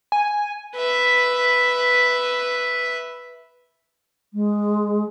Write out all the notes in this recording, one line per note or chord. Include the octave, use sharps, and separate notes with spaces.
G#5
B4 E5
G#3